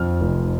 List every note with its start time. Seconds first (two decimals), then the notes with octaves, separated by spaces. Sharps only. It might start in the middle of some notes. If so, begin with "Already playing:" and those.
Already playing: F2 F6
0.21 F1